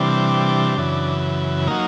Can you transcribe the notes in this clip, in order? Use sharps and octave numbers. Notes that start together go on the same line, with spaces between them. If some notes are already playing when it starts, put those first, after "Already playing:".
Already playing: C3 E3 G3 D4
F#2 C#3 E3
F#3 A#3 D#4